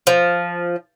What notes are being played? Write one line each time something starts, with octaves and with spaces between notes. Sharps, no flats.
F3